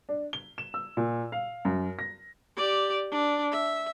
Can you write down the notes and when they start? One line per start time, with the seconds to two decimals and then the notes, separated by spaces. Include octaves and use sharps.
0.09 D4
0.33 G7
0.58 E7
0.74 E6
0.97 A#2
1.32 F5
1.65 F#2
1.99 A#6
2.57 G4 D5
3.11 D4
3.52 E5